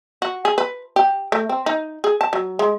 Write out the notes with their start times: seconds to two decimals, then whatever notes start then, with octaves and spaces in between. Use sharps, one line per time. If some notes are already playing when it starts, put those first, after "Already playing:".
0.22 F#4
0.45 G#4
0.58 B4
0.96 G4
1.32 A3
1.49 C4
1.66 D#4
2.04 G#4
2.21 A5
2.33 F#3
2.59 G#3